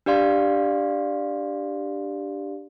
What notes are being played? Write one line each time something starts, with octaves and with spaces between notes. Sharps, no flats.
D4 G4 D5 F5 C6